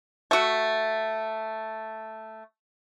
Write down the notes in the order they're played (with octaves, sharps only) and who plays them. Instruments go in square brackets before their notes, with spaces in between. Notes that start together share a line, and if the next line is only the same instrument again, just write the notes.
[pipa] A3 F#4